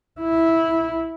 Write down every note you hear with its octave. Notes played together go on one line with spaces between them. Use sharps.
E4